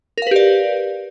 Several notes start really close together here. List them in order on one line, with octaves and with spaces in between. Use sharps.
A#4 F5 B4 G4 D5